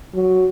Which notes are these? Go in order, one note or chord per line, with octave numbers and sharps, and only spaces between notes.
F#3